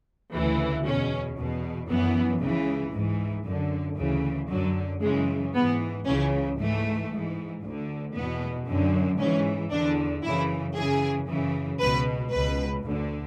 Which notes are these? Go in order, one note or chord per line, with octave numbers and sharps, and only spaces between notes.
D2 C#3 E3
E2 B2 C#4
E2 B2
F#2 E3 B3
C#2 C#3 E3
G#2 E3
F#2 D3
D2 C#3 E3
F#2 D3 F#3
F#2 C#3 E3 G#3
G#2 E3 B3
C#2 C#3 E3 C#4
G#2 E3 A3
G#2 E3
D2 D3
E2 B2 B3
F#2 D3
G#2 E3 C#4
E2 D3 D4
F#2 C#3 E3 E4
F#2 C#3 E3 G#4
F#2 C#3 E3
C#2 B2 B4
C#2 B2 B4
D2 D3